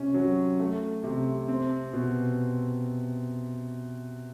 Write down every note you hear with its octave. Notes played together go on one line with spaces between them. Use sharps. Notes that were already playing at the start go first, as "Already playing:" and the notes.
Already playing: C3 C#4
F#3
A3
C3
C4
B2